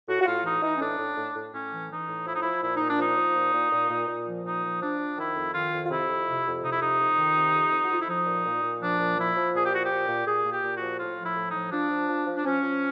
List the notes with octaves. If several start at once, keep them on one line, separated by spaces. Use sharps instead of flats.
A2 F#4
F#4
A2 F4
E3 D#4
E3 D#4
C#4
A2 D4
A2
A2
A2
A2 C#4
E3
E3 D#4
A2
F3 E4
D#4
F3 E4
A#2 E4
D#4
A#2
D4
F3 D#4
F3
A#2
A#2
A#2
A#2
A#2
F3
A#2 D#4
F3
F3 D4
F3
D#3 E4
F2
D#3 F4
F2
F4
C3 E4
F2
C3
F2
C3 D#4
E4
F2 D#4
F2
D#3
C3
F2
F2
F#4
F2 F4
E4
F3 D#4
A#2
A#2
A#2
F3 D4
A#2
F3 E4
F3
A#2 G#4
G4
F3 F#4
G4
A#2
A#2
A#2 G#4
A#2
G4
A#2
F#4
F3
A2 F4
F3
E4
A2
D#4
F3
F3 D4
F3
F3
F3
D4
F3 C#4
F3